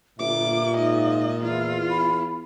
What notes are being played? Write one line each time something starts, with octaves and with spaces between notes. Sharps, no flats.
G1 A#2 E5 D6
G#2 D#5
E2 E4 F4
B5